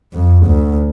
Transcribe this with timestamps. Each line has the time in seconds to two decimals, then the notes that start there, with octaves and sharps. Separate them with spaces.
0.14 F2
0.47 D2